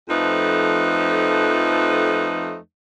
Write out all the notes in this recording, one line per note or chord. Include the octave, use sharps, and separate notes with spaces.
F2 F3 A3 D#4 B4